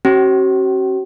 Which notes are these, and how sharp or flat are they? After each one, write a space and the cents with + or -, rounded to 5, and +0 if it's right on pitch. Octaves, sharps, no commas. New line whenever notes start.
C#4 -40 F#4 +40